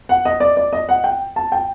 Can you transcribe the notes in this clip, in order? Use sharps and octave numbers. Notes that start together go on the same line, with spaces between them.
F#5
D#5
D5
D5
D#5
F#5
G5
A5
G5